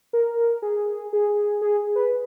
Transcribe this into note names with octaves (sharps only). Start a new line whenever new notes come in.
A#4
G#4
G#4
G#4
B4